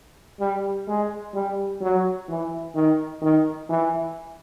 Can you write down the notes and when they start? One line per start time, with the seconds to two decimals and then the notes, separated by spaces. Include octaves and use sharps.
0.40 G3
0.88 G#3
1.34 G3
1.81 F#3
2.29 E3
2.75 D#3
3.22 D#3
3.69 E3